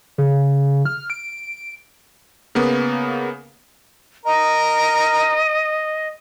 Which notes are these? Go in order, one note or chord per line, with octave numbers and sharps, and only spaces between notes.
C#3
F6
D7
C#3 A#3 B3
A#4 D#5